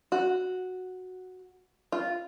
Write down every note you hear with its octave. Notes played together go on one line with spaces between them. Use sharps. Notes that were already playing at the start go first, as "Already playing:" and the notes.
F#4
F4